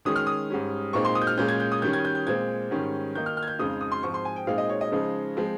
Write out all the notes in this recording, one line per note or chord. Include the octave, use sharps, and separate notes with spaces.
D#3 G#3 C#4 D#6
F6
D#6
G#2 G3 C#4
A#2 G#3 C4 D#4 C#6
C6
D#6
G6
F6
A#2 G#3 C#4 G6
G#6
G6
D#6
D#3 G3 C#4 G6
G#6
G6
G6
A#2 G#3 C4 G#6
G#2 D#3 G3 C#4
D#3 A#3 D#4 G6
F6
F6
G#6
G6
F2 C#3 G#3 D#4 D#6
D#6
C6
G#2 F3 C4 C#6
C6
G#5
G5
A#2 G#3 C4 D#4 F5
D#5
C#5
D#5
C#3 F3 G#3 D#4
F3 G#3 C4